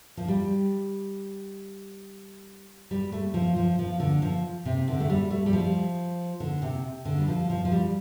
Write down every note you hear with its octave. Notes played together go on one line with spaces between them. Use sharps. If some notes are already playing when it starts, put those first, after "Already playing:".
F3
G3
G3
A3
F3
F3
F3
D3
F3
C3
D3
A3
G3
A3
G3
F3
D3
C3
D3
G3
F3
F3
F3
G3